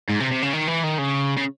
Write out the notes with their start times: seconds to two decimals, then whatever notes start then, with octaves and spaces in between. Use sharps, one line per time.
0.09 G#2
0.20 C3
0.31 C3
0.43 C#3
0.53 D#3
0.68 E3
0.84 D#3
0.99 C#3
1.38 C#3